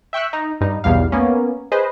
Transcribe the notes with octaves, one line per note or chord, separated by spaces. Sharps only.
E5 G5 C#6 E6 F#6
D#4
G2 D#4
B1 E2 G3 F5
A#3 B3 C#4
G#4 B4 C5 D#5